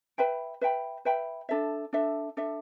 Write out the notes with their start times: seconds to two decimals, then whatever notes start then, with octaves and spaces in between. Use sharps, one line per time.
0.18 B4 E5 G5 B5
0.61 B4 E5 G5 B5
1.05 B4 E5 G5 B5
1.49 D4 A4 E5
1.93 D4 A4 E5
2.37 D4 A4 E5